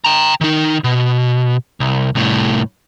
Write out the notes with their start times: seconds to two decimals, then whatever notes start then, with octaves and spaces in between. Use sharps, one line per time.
0.05 G5 A#5
0.41 D#3 D#4
0.84 B2
1.80 C2
2.15 C2 A2